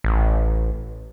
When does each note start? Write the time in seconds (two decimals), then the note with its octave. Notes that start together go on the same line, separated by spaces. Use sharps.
0.04 A1